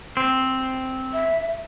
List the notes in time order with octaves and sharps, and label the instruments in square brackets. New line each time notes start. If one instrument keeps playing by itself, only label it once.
[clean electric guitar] C4
[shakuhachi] E5